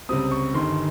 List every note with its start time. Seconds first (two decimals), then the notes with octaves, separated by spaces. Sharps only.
0.09 C#2 C3 G3 C4 D#6
0.31 C#6
0.54 G1 G2 D#3 C6